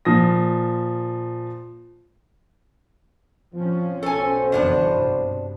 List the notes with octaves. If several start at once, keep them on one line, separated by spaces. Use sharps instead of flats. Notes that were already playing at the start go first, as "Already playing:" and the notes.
A#2 F3 D#6 A#6
F3 C4 C#4
B1 F#4 A4 C5 G#5
F#1 F2 E3 G3 B3 D4
G2 C3